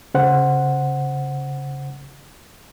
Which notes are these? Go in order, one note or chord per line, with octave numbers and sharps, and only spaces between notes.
C#3 C5 F#5